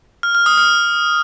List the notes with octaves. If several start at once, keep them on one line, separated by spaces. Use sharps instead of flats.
F6
F6
D#6
F6